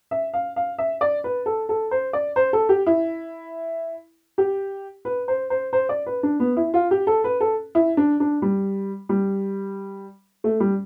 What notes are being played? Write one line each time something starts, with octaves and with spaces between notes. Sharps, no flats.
E5
F5
F5
E5
D5
B4
A4
A4
C5
D5
C5
A4
G4
E4
G4
B4
C5
C5
C5
D5
B4
D4
B3
E4
F4
G4
A4
B4
A4
E4
D4
D4
G3
G3
A3
G3